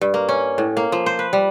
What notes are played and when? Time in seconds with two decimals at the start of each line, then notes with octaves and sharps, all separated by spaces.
0.01 G2
0.14 A#3
0.29 C#4
0.58 A2
0.77 A#3
0.92 F3
1.06 C5
1.19 B4
1.33 G3